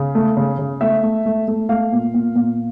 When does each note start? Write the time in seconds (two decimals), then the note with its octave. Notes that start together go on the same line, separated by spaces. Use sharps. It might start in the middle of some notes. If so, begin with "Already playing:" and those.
Already playing: C#3
0.15 A3
0.37 C#3
0.59 C#3
0.81 A3 E5
1.03 A3
1.26 A3
1.48 A3
1.69 A3 F5
1.92 A#2
2.14 A#2
2.36 A#2